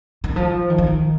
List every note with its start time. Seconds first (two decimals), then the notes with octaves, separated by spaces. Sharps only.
0.24 D#3
0.36 F3
0.70 D#3
0.78 F3
0.86 D#3